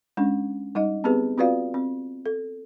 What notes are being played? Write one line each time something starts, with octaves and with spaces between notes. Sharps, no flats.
G#3 C#4 D4
G3 D#4 D#5
B3 C4 G4 G#4 B4
C4 F4 F#4 B4 D5 F5
C4
A4